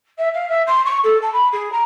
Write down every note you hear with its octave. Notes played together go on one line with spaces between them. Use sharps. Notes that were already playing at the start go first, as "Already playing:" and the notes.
E5
F5
E5
C6
C#6
A4
A5
B5
G#4
A#5